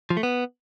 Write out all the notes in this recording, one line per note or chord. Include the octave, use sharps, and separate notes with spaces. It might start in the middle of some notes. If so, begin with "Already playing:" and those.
F3
A3
B3